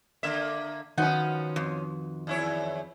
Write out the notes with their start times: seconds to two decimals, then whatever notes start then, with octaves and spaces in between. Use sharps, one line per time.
0.23 D3 A#3 E5
0.98 D#3 F3 C#4 D#4 F#4 B4 F#5
1.56 F2
2.27 E2 E4 C#5